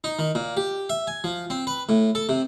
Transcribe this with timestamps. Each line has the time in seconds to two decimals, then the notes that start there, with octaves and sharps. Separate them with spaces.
0.04 D#4
0.19 D#3
0.35 A#2
0.57 G4
0.90 E5
1.07 G#5
1.24 F3
1.50 C4
1.67 B4
1.89 A2
2.15 A4
2.29 C3